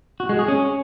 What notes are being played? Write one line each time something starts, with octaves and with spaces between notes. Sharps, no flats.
F#4
G#3
G#4
C#4